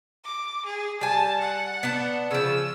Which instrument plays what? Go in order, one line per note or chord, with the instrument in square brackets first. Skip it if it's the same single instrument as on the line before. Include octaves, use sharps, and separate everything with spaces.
[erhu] D6
G#4
[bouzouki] G3 G#5 [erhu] A5
[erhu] F#5
[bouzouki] B3 D4 A5
[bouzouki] C#3 F3 [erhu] E6